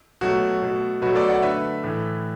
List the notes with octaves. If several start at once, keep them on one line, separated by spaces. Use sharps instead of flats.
B2 F#3 A3 F#4
B2 A3
B2 F#3 A3 F#4 B4
A4 D5
D5 F#5
D3 A3 B4 E5
A2 E3 A3